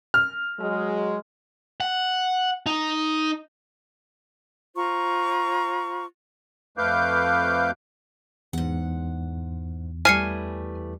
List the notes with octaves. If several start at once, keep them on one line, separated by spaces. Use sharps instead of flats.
F6
F#3 G#3
F#5
D#4
F4 C5 A#5 C#6
F2 A3 B4 F5 D6 G6
E2 G#2 F#5
E3 G3 A3 G#5 F6 C7 C#7